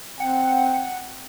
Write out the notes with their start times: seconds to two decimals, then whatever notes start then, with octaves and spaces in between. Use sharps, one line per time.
0.20 C4 F#5 G5